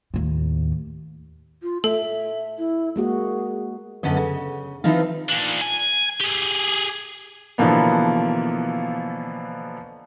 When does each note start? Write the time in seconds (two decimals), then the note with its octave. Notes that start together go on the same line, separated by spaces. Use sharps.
0.14 D#2 A2
1.63 F4
1.84 A3 A4 E5
2.58 E4
2.96 G#3 A#3 F#4 G#4
4.03 F#2 D3 B3 C#4 D#5
4.16 C#3
4.84 E3 F3 C4 D#4 F4
5.29 A#2 D4
5.61 G#5
6.20 G4 G#4
7.58 B2 D3 E3 F3 A#3 B3